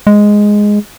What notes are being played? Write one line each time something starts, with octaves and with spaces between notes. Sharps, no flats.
G#3